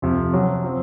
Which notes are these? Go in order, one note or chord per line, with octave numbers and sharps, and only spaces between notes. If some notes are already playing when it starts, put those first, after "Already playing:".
F2 C3 F3
C3 F#3 C#4
F3 C4